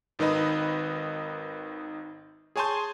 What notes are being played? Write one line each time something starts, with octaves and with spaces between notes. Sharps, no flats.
G#1 D#3 D#4 B4 D#5 B5
G#4 C#5 G#5 A5 C6 G6